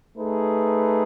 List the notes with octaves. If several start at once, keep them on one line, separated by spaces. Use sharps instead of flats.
A3 D#4 G#4 B4